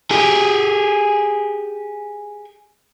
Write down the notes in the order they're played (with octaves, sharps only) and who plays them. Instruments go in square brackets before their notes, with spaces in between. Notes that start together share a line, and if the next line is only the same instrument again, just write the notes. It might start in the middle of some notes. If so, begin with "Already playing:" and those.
[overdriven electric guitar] G4 G#4